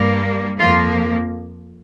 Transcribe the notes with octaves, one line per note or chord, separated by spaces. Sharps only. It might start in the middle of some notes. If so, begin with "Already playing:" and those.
Already playing: G2 G3 A#3
F2 F3 A#3 F4